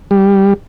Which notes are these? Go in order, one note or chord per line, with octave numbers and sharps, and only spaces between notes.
G3